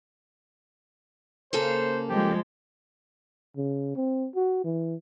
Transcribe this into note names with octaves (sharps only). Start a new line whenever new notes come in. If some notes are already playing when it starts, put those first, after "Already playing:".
C#3 A#3 A4 C5
F3 G#3 G4
C#3
C4
F#4
E3